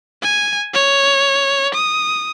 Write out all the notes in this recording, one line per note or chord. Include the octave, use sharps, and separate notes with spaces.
G#5
C#5
D#6